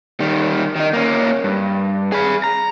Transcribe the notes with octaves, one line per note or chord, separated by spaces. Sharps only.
D#3 G3
D#3 D#4
A#3 C#4
G2
G#4 B5
A#5